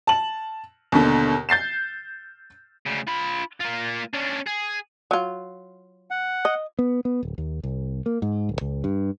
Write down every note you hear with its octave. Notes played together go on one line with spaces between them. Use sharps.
A5 F#7
D#2 B2 D3
G6 A6 C7 E7
D2 C#3
F4 B5
A#3 F4
C#4 D4
G#4
F#3 F4
F#5
D#5
B3
B3
D1
D#2
C2
A#3
G#2
D1
C#2
G2